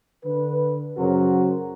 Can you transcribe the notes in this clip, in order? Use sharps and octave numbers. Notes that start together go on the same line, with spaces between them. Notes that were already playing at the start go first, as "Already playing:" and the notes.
D3 B4
F#2 C#3 F#3 F#4 A#4 C5